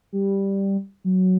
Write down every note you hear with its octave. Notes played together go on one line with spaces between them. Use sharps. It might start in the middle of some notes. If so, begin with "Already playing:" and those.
G3
F#3